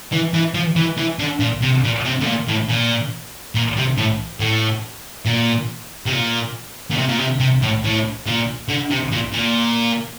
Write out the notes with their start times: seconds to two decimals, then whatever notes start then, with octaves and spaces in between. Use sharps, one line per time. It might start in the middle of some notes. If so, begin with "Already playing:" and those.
0.12 E3
0.34 E3
0.54 F3
0.76 E3
0.98 E3
1.19 D3
1.40 A#2
1.62 C3
1.84 A#2
2.05 C3
2.21 A2
2.26 A#2
2.48 A2
2.69 A#2
3.55 A#2
3.77 C3
3.97 A2
4.40 A2
5.26 A#2
6.06 C3
6.12 A#2
6.91 A#2
6.98 C3
7.09 A#2
7.19 C3
7.40 C3
7.62 A2
7.84 A2
8.26 A#2
8.68 D3
8.90 C3
9.12 A#2
9.33 A#2